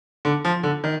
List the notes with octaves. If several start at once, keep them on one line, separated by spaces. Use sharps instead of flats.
D3
F3
D3
D#3